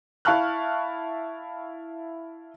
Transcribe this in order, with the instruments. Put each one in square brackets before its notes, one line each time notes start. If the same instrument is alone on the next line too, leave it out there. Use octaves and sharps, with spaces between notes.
[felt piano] E4 F5 A5 C#6 F6 F#6